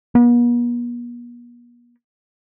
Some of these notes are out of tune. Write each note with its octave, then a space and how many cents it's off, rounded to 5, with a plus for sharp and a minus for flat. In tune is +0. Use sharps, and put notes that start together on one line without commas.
B3 -45